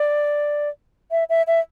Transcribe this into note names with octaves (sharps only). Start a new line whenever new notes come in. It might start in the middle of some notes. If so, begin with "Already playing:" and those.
Already playing: D5
E5
E5
E5